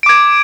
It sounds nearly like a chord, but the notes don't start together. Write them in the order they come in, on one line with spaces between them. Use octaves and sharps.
D7 D6 G#6